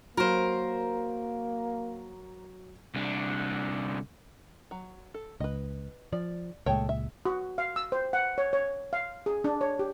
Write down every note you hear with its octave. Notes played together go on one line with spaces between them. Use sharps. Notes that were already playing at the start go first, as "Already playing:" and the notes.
F#3 A#3 A#4 C5
C2 D3
F#3
A4
C#2 B4 D#5
F3 D5
C#2 A#2 G#3 A3 C#5 G5
E5
F#4
F5
E6
C5
F#5
C#5
C#5
F5
G#4
D4
C#5
G4